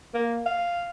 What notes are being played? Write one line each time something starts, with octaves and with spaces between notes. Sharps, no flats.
A#3
F5